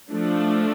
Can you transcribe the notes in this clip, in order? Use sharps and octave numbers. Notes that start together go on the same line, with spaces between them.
F3 A3 D4